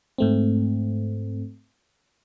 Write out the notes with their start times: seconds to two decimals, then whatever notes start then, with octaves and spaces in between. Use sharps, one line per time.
0.18 G#2 A3 C4